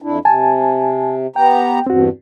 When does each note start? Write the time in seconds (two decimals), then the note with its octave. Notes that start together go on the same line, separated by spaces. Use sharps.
0.02 F2 D4 E4
0.25 C3 G#5 A5
1.36 B3 G4 G5 A#5
1.87 E2 G2 C4 F#4